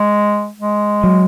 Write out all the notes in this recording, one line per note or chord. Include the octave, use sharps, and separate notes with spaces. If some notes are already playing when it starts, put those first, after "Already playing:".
Already playing: G#3
G#3
F#3